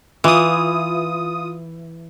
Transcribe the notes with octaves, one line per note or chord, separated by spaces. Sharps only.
E3 F4 D#6